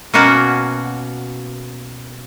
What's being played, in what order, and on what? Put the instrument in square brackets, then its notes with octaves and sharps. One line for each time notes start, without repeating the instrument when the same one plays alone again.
[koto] B2 A#3 C#4 F#4 A#4 F#5